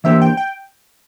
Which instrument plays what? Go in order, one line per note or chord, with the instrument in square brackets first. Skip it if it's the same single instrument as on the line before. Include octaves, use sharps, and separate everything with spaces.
[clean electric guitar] E3 A#3 D4 G4 C5 [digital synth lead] E5
[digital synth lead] G5
G5